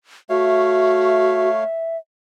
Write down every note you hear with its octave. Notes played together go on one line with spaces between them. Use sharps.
A3 F#4 C#5 E5 F5